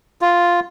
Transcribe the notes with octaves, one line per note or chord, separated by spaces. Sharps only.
F4